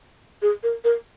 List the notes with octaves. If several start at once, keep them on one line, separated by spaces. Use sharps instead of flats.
G#4
A#4
A#4